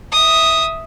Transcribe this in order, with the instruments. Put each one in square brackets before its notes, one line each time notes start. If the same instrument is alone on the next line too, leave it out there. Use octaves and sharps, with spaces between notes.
[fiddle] E5 D#6